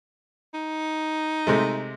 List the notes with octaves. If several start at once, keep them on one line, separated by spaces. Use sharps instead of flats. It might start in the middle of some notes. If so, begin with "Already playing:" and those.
D#4
C3 G#3 A3